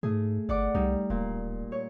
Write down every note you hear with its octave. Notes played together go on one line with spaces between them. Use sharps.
G#2 A3 G#4
G1 D5 F#5 D6
C2 G3 D#4
D1 A#2
C#5